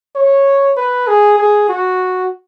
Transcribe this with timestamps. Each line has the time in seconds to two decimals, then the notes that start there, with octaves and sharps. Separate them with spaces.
0.16 C#5
0.77 B4
1.08 G#4
1.38 G#4
1.69 F#4